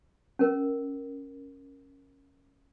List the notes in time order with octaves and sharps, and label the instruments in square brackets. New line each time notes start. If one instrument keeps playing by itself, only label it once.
[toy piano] C#4 A#4